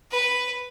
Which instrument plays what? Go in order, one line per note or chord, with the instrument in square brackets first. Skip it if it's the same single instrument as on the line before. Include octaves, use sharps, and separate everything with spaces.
[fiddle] B4